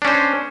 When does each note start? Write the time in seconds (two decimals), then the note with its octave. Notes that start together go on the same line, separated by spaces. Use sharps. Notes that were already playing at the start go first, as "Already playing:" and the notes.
0.02 D4
0.05 C#4
0.08 C5